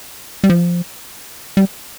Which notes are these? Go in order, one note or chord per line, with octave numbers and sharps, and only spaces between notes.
G3
F3
G3